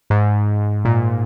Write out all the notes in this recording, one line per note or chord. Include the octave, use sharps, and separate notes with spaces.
G#2
A#2